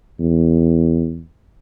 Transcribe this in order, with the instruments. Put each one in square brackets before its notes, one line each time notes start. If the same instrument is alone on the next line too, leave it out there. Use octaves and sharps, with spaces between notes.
[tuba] E2